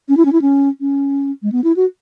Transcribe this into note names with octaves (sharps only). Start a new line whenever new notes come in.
C#4
E4
C#4
E4
C#4
C#4
G#3
B3
E4
F#4